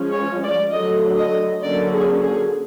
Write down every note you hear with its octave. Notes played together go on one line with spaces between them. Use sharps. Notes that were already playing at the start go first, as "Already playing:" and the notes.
Already playing: F3 G#3 C#4
C#5
D5
D3 F#3 A3 D#5
D#5
D3 F#3 A#3 C#4 D5
G#4
G#4